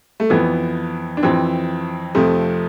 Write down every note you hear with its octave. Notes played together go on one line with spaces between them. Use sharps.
A3
F2 E3 B3
D4
F2 E3 C4
F2 C3 F3 A3